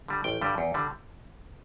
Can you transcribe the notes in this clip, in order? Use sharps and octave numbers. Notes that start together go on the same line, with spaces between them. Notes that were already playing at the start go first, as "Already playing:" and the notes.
D3 G3
A1 G5
G2 D3 G3
E2
D3 G3